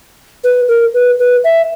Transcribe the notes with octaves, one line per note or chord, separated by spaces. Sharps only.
B4
A#4
B4
B4
E5